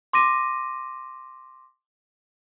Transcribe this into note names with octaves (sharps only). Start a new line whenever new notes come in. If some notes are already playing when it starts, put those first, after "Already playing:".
C6 D6 A#6 D#7